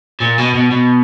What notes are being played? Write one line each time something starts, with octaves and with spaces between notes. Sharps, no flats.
A#2
B2
B2
B2